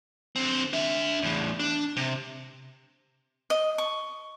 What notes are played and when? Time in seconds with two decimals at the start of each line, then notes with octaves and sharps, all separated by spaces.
0.36 D3 C4
0.73 D4 E5
1.22 E2 A2
1.60 D4
1.96 C3
3.50 D#5
3.78 C#6